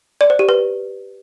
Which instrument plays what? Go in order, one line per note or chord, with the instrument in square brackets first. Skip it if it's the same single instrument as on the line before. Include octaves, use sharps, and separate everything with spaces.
[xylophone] D5
C5
G4
B4